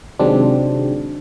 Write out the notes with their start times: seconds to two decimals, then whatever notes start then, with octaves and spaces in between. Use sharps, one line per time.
0.19 C3 D#3 F#3 G#3 C4 D4